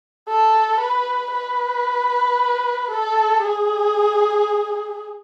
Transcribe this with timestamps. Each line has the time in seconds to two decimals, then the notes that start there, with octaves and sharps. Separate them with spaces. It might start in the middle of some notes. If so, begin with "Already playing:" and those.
0.28 A4
0.80 B4
1.32 B4
2.90 A4
3.42 G#4